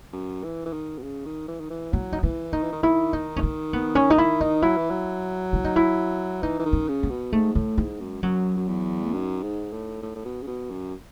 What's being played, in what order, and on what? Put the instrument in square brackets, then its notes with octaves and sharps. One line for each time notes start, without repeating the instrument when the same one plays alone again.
[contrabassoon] F#2
E3
E3
D#3
B2
C#3
D#3
E3
D#3
E3
[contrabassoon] F#3 [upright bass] E4
[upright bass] D#4
[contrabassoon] E3 [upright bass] E4
[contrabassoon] D#3 [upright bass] D#4
[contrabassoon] E3
D#3
[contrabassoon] D#3 [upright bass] E4
[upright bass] D#4
C#4
D#4
B3
C#4
D#4
E4
D#4
[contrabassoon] F#3 [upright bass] E4
[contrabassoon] E3
F#3
[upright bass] E4
D#4
E4
[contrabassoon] E3 [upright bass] D#4
[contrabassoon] E3
D#3
[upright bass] C#4
[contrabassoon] C#3
[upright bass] B3
[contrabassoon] B2
[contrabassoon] G#2 [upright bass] A3
[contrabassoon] A2 [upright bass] A3
[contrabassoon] G#2 [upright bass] E4
[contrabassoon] F#2 [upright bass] G#3
[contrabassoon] F#2 [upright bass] F#3
[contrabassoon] F#2
E2
[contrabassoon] F#2 [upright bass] D#4
[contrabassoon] G#2
A2
A2
A2
B2
C#3
B2
F#2